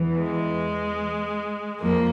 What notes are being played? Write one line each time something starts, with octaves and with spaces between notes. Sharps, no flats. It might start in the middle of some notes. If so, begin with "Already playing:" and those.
Already playing: E2 E3
G#3
F2 F3 A#3